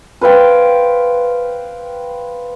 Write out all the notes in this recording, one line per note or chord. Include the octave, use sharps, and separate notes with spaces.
B4 C5 F5 G5